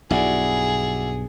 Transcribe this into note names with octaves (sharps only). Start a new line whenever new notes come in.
B1 G2 E4 F#4 G#4 D5